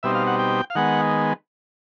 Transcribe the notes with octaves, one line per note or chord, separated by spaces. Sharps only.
B2 G3 C4 D#4 E5
F5
F#5
G5
F5
D#3 G#3 B3 F#5